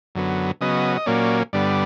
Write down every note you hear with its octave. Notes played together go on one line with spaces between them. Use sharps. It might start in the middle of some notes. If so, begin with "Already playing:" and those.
F#2 D3 F#3 B3
C#3 F#3 B3 D#5
D#5
A#2 F#3 A#3 C#4 D5
G2 D3 G3 B3 D5